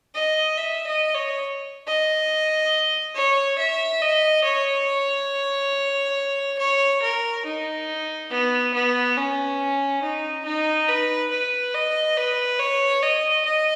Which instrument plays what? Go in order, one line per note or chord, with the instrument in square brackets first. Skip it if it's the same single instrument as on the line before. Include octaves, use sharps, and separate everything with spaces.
[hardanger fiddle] D#5
E5
D#5
C#5
D#5
C#5
E5
D#5
C#5
C#5
A#4
D#4
B3
B3
C#4
D#4
D#4
B4
B4
D#5
B4
C#5
D#5
D#5